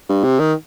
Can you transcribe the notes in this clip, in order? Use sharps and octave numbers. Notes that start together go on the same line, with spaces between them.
G2
C3
D#3